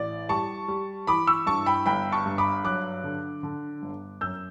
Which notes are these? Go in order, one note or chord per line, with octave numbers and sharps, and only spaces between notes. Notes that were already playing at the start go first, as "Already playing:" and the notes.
Already playing: A1 D5
G3 A5 C#6
G3
E3 B5 D6
C#6 E6
G2 A5 C#6
G5 B5
G1 G5 B5
A5 C#6
G2
B5 D6
F#3 D6 F#6
D3
D3
G1
F#2 E6 G6